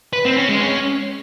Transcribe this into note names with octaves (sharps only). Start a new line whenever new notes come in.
B4
C4
C#4
G#3
C#4